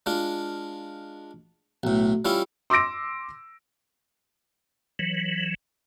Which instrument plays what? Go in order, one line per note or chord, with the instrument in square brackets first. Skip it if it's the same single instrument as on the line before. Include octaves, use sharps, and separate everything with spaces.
[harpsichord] G#3 D4 F4
B1 A2
G3 C#4 E4 F4
[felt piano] C6 D6 E6 A#6 D7
[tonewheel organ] E3 F#3